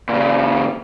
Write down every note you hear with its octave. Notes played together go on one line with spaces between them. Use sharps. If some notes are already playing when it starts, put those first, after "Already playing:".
A#2 C#3